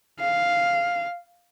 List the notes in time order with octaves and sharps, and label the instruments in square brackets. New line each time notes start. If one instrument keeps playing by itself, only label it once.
[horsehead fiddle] F5